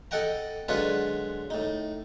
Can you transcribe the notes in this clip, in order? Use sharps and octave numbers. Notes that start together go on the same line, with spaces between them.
A4 D#5 F#5 G5 A#5
D3 F#3 G#3 F4 G#4 B4
A2 D#4